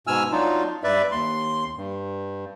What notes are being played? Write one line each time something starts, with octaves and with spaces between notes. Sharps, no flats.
G#2 B2 G#5 E6 F6
F#3 D4 D#4 F4
G2 B4 D5 E5
D#2 C6
G2